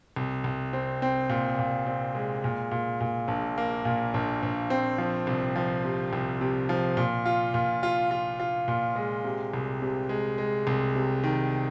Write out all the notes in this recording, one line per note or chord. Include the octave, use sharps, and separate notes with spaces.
C2
C2
C4
C4
A#2
A#2
C4
G#3
A#2
A#2
A#2
A#1
A#3
A#2
A#1
A#1
C4
F3
C2
F3
C3
C2
C3
F3
A#2
F4
A#2
F4
F4
F4
A#2
G#3
C3
C2
C3
G#3
G#3
C2
C3
D#3